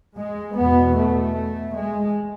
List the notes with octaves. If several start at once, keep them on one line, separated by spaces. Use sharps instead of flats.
G#3
E2 B2 B3
A3
G#3